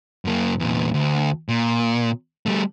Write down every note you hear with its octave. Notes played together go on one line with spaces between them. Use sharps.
F#2 A#3
E2 A#2
D2
A#2
G3 A3